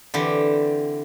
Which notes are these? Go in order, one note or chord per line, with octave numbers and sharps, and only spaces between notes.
D3 E3 C4 G4